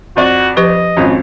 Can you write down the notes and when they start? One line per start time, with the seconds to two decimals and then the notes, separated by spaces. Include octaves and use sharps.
0.16 F2 F#4 D5
0.57 F3 G4 B4 D#5
0.97 G#1 F2 C#4